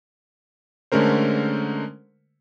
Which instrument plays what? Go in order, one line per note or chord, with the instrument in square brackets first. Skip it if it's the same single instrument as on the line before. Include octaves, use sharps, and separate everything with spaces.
[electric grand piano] D3 G#3 A3 C#4 A#4 C5